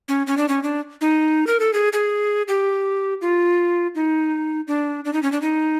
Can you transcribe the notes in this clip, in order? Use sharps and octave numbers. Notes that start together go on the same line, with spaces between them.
C#4
C#4
D4
C#4
D4
D#4
A#4
A4
G#4
G#4
G4
F4
D#4
D4
D4
D#4
C#4
D4
D#4